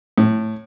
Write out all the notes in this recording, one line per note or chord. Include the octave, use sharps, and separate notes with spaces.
A2